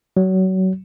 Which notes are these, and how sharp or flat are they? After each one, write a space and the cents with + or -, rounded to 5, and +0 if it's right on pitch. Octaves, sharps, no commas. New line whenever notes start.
F#3 +25